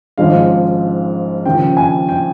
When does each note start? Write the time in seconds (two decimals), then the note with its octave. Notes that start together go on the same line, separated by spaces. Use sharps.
0.18 G#1 G#2 F3 G#3 C#4 F5
1.46 D#2 C#3 F3 G5
1.77 G#5
2.09 G5